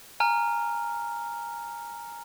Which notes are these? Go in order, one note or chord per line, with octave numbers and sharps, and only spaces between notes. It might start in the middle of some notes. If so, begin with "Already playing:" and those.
G#5 A#5 F6